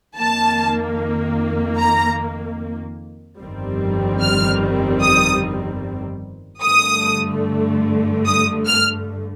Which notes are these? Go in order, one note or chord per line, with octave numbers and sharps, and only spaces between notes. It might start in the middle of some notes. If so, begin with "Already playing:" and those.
F2 D#3 A#3 A5
A#5
G1 F2 D#3 G3 C4
F6
D#6
G2 D3 A3 D#6
D#6
F6